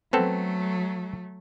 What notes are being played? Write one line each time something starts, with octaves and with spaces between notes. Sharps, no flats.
F#3 A3 B3 C4 A4